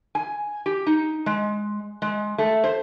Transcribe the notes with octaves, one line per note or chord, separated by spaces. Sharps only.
G#5
G4
D#4
G#3
G#3
A3
C5